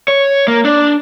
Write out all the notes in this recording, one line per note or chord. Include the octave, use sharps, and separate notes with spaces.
C#5
A#3
D4